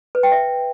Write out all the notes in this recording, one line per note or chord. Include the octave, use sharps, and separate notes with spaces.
B4
G5
E5